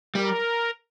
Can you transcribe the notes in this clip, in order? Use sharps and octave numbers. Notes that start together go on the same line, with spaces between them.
G3 A#4